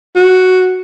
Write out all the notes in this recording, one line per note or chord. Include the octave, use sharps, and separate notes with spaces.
F#4